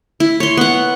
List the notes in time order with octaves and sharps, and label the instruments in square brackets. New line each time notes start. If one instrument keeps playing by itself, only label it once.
[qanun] E4
C#5 C6
B3 F#5